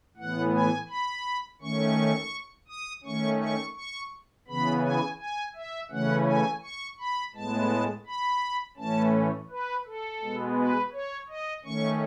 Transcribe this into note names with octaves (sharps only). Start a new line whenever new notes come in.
A2 E3 B3 F#5
G#5
B5
D#3 A3 C#4 C#6
D#6
D#3 A3 C#4 C#6
C#6
C#6
C#3 E3 B3 B5
G#5
G#5
E5
C#3 E3 A3 C#4 F#5
G#5
C#6
B5
A2 G#3 B3 A5
B5
A2 E3 A3 C#4 A5
B4
A4
B2 G#3 B3
B4
C#5
D#5
D#3 A3 C#4 C#6